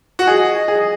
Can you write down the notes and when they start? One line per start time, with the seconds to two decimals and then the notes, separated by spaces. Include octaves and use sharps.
0.19 F#4
0.27 G#4 D#5
0.68 G#4